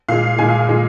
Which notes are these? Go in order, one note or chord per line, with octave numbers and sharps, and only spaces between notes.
A#2 G#3 F5
A#2 G#3 G#5
F5
F5
A#2 G#3